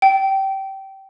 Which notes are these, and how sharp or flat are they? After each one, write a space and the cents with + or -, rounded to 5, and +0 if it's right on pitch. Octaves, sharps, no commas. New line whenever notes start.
G5 -20